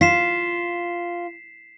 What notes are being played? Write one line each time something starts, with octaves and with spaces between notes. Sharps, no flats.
F4 B6 C7 E7